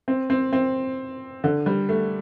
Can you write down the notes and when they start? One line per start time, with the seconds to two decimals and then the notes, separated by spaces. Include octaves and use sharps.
0.08 C4
0.30 C4
0.53 C4
1.44 D3
1.66 G3
1.89 A3